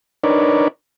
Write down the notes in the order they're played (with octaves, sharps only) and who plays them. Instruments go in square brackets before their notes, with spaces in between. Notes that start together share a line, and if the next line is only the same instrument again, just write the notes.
[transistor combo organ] D4 D#4 A#4 B4 C#5 D5